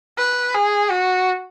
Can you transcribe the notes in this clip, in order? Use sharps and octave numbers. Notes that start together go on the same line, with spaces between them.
B4
G#4
F#4